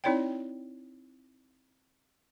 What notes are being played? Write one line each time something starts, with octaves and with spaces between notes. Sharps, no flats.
C4 D#4 E4 C#5 D5 G5